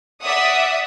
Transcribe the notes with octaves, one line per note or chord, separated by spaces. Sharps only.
D5 E5 F#5 D#6